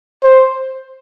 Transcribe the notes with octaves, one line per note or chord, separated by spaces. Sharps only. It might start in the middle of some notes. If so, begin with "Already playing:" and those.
C5